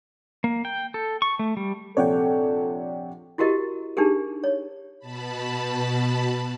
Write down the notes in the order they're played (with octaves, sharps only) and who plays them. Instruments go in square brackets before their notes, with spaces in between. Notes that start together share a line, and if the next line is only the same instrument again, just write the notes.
[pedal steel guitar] A#3
G5
A4
C#6
A3
G3
[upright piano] A#1 C3 C#5 [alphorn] A4 [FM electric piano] D5 F#5 G5
[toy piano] E4 F#4 G4 A#4 D#5
D4 D#4 G4 G#4 A#4
C#5
[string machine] B2 A5 B5